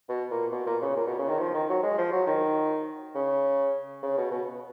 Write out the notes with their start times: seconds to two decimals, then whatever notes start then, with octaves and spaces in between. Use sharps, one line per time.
0.09 B2
0.31 A#2
0.52 B2
0.67 A#2
0.82 C#3
0.96 A#2
1.07 B2
1.19 C#3
1.29 D#3
1.40 F3
1.54 D#3
1.69 F#3
1.83 G#3
1.98 F3
2.12 F#3
2.27 D#3
3.15 C#3
4.03 C#3
4.18 B2
4.31 B2